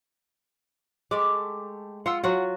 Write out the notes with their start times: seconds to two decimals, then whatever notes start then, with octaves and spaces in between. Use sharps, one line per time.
1.11 G#3 A3 G4 D6
2.06 F4 F#5 C6 E6
2.24 F#3 F4 F#4 F#5